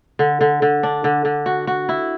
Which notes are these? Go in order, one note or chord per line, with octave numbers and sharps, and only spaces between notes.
D3
D3
D3
D4
D3
D3
F#4
F#4
E4